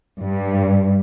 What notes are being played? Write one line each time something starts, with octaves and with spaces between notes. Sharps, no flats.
G2